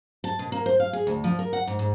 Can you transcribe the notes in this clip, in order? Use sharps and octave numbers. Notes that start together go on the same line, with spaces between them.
A5
B2
A#3
C5
F5
G#4
D2
F3
A#4
F#5
G#2
G#2